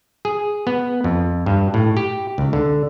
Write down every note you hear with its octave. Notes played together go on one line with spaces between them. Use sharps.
G#4
B3
F2
G2
A2
G4
C#2
D3